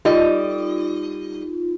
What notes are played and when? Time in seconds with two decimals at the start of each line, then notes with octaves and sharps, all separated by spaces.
0.05 G3 D#4 F4 D#5